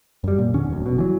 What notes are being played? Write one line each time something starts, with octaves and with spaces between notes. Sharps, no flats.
F#2 G3
A#2
E2 D3 C#4
D1 D2
F1 B2
E3 F#3